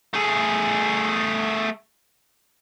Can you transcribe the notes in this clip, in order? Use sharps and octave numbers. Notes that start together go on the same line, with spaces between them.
A3 G#4